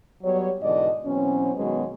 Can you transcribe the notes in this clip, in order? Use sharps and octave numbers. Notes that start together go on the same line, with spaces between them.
F#3 G3 B3 C#5
G#2 B2 D3 E3 D5 D#5
B2 E3 F#3 C4 C#4
B2 D#3 F#3 G#3 B3 C#4